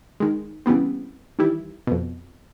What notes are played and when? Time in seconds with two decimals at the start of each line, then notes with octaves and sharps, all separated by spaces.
0.20 D#3 G#3
0.66 C#3 E3 G3 B3 C4
1.39 D#3 E3 G3 E4
1.87 F2 B2